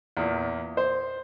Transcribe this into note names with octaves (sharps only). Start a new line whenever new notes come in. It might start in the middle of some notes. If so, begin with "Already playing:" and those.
E2 A#2
C5